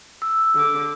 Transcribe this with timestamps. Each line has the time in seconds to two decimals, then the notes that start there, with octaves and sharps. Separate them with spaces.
0.22 E6
0.55 D3 D6